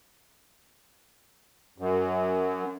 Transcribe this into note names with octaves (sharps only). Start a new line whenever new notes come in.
F#2